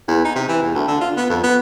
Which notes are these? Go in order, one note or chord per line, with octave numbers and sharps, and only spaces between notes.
E2
D#4
C3
E3
E2
D2
D3
F4
B3
F2
B3